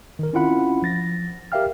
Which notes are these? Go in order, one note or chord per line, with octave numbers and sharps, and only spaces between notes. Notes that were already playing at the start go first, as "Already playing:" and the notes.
D#3 A#4
C4 C#4 E4 F4 F#5 B5
F3 A6 A#6
G4 A#4 E5 F5 G5 F6